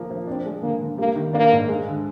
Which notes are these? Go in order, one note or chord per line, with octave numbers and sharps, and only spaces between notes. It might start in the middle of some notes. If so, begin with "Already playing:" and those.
Already playing: F3 A#3
F3
C4 D4
G#3
D3 A#3
D3
G3 A#3
D#3
A#3 D4
G#2
G#3
D3